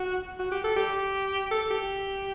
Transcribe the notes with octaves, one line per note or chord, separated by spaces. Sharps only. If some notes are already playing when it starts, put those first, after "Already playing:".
Already playing: F#4
F#4
G4
A4
G4
A4
G4